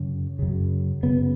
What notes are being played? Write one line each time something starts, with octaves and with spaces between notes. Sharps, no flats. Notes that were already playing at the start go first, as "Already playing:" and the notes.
Already playing: F#2 C#3
F#2 C#3
F#2 C#3 B3